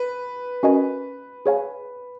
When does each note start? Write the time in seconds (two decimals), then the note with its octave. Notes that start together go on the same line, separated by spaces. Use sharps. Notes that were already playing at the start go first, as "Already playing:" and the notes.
Already playing: B4
0.63 C#4 F#4 A#4 D#5 G#5
1.46 G#4 C#5 F5 G#5